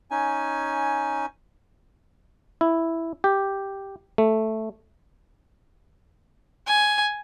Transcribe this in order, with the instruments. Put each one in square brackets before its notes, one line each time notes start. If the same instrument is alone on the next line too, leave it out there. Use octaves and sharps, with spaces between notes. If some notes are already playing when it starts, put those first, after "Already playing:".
[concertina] C#4 D#4 G#5
[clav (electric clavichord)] E4
G4
A3
[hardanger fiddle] G#5